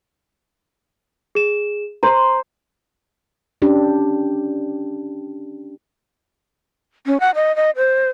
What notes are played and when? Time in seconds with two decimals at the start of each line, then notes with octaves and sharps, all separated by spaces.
1.35 G#4 E7
2.03 C5 A#5
3.62 C#4 D4 G4
7.06 C#4
7.20 F#5
7.35 D#5
7.56 D#5
7.76 C5